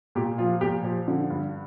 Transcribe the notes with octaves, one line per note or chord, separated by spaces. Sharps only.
A#2 G4
F3 F4
A#2 G4
F3
D3
G2